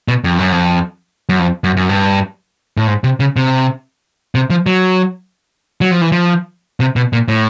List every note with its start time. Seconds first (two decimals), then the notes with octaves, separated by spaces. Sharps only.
0.08 B2
0.24 F2
0.39 F#2
0.52 F2
1.29 F#2
1.39 F2
1.64 F#2
1.77 F#2
1.89 G2
2.77 A2
2.87 G#2
3.04 C3
3.20 C#3
3.36 C3
4.35 C3
4.50 F3
4.66 F#3
5.81 F#3
5.91 F3
6.02 E3
6.12 F3
6.80 C3
6.96 B2
7.13 A#2
7.28 A2